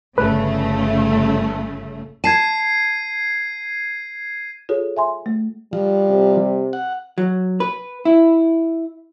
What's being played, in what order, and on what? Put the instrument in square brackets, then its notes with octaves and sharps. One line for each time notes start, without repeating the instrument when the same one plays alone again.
[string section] G1 C#3 A3 [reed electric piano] B4
[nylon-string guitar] A5 [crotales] G#6 C7 D#7
[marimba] F4 G#4 A4 C#5
E5 G#5 C6
A3
[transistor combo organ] F3 [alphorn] G3
[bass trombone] C3
[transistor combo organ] F#5
[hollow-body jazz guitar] F#3
B4
E4